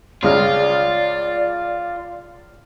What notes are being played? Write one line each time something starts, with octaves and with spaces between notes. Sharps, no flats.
C#2 G#3 F4 D5 F6